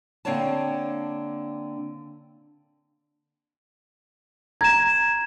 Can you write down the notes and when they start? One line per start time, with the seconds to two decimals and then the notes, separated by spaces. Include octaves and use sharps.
0.25 D3 A#3 C4 D4 C#5 A5
4.61 A#5 G#6 E7